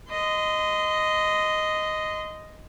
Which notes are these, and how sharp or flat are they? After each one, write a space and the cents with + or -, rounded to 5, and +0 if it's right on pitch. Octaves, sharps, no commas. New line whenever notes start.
D#5 +0 C6 -30